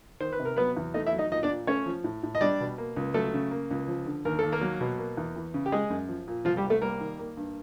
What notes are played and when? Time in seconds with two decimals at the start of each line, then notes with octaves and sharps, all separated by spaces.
0.20 D#3 C5
0.32 B4
0.40 C3
0.45 A#4
0.57 F#3 B3 B4
0.77 E2
0.94 A3 D#4 D#5
1.07 E4 E5
1.13 F#3
1.18 D#4 D#5
1.31 A#2 D#4 D#5
1.43 D4 D5
1.49 A#2
1.67 A3 C#4 C#5
1.86 F3
2.04 A2
2.23 A2
2.35 D#5
2.41 G3 D4 D5
2.60 B2
2.78 A#3
2.96 C#2
3.14 F#3 A3 A4
3.34 C#3
3.51 A#3
3.71 C#2
3.88 F3
4.06 D3
4.25 D#2 A#4
4.39 D#2 A4
4.52 A#3 A#4
4.61 F#3
4.81 B2
4.98 A#3
5.17 E2
5.36 E3
5.54 C#3
5.66 G4
5.72 G#3 G#4
5.90 F#2
6.08 F3
6.27 A#2
6.45 C2 F3 F4
6.57 G3 G4
6.64 C2
6.70 A3 A4
6.82 G3 A#3 A#4
7.01 D#3
7.19 A#3
7.37 G2